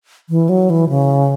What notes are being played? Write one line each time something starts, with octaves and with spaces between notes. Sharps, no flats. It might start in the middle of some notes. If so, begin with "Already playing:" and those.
E3
F#3
E3
C#3